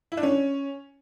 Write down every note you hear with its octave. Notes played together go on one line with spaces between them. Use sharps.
E4
D4
C#4